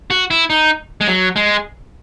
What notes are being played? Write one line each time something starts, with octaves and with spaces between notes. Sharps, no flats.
F#4
E4
D#4
G#3
F#3
G#3